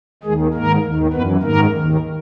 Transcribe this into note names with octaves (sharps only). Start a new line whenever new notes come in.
D#2 D#3 G#3 G#4
G#2 D#3 A#3 A#4
D#2 D#3
F#2 E3 B3 B4
G#2 D#3 A#3 A#4
D#2 D#3